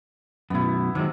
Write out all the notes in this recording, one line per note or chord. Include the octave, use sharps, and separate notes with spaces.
F#2 B2 B3 E4
C3 D#3 F#3 G#3